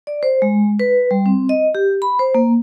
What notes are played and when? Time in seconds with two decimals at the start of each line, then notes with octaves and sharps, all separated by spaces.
0.07 D5
0.23 C5
0.42 G#3
0.80 B4
1.11 G3
1.26 C4
1.49 D#5
1.75 G4
2.02 B5
2.19 C5
2.35 A#3